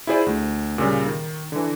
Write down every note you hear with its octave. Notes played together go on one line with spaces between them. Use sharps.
E4 F4 G#4 C5 D5
D2
A#2 C#3 G3
D#3
D3 E3